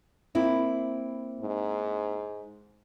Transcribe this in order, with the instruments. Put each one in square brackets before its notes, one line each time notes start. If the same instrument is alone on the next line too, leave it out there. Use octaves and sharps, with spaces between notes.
[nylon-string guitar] A#3 C4 E4
[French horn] G#2